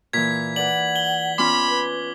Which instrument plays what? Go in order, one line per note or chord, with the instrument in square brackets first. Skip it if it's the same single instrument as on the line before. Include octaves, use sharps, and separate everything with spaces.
[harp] A#2 E3 [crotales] G#6 B6
[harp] B4 D5 [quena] F#5 [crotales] F#7
[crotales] F#7 G7
[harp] B3 C#4 F4 [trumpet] B5 [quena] C6 [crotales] D6
[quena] B4